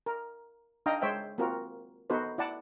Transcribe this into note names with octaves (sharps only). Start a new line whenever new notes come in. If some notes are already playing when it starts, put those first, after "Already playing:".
A#4
D4 D#4 D#5 F5 G5 A#5
G#3 C5 C#5 E5 G5
A#3 C4 F4 F#4 A#4
B3 D#4 F#4 A4 B4 C5
E4 D5 F#5 A5